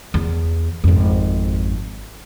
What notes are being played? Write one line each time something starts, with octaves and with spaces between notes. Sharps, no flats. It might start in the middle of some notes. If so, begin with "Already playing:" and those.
E2
G#1 F2